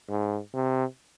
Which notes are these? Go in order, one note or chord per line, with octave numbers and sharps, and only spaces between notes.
G#2
C3